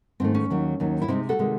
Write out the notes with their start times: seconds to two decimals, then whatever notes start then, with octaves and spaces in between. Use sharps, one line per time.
0.20 G#2 D#3 A3 C4
0.35 C#4
0.50 D#2 D#3 F#3
0.80 D#2 D#3 F#3
1.02 E4
1.08 C3 D#3 G#3 C4 D#4
1.29 F#4 A4
1.39 C3 D#3 G#3